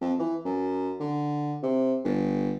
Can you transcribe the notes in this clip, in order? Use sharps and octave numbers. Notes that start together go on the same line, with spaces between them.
F2
E3
F#2
D3
C3
G1